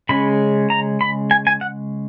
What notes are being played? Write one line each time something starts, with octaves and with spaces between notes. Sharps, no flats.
C#3 G#3 C#4 B5
A#5
B5
G#5
G#5
F#5